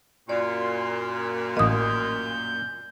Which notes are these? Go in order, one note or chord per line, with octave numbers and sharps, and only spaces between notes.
F#2 A#2 D5 C6
A1 A#3 D#5 D#6 G6